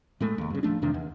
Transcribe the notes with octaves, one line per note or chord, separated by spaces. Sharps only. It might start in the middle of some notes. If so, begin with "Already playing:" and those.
A2 G#3 A3
F1 D#2
G2 C#3
D1 F3 A3 D4
E2 C3 D#3 D4
D#2